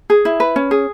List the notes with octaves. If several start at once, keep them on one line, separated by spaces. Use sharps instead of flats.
G#4
E4
B4
C#4
G#4